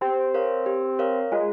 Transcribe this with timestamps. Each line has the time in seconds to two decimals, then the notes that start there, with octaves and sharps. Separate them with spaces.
0.01 C4 G4
0.34 A#4 C#5 F5
0.66 G4
0.99 A#4 C#5 F5
1.32 G#3 F4